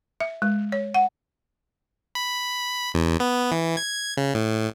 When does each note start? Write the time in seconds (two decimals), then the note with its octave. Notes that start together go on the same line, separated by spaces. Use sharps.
0.20 E5
0.42 G#3
0.72 C#5
0.94 F#5
2.15 B5
2.94 E2
3.20 B3
3.52 E3
3.77 G#6
4.17 C#3
4.34 A2